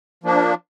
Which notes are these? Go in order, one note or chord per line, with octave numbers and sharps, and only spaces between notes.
F3 A#3 D4